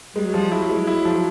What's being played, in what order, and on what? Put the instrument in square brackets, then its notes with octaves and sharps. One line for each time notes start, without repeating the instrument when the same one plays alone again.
[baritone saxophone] G3 [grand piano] G#3
[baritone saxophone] F#3
[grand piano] F3 [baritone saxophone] G3
[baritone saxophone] F#3 [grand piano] E4
[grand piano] G#3
[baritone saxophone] F#3 [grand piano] E4
[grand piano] F3